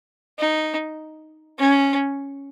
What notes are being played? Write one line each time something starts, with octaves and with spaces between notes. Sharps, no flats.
D#4
C#4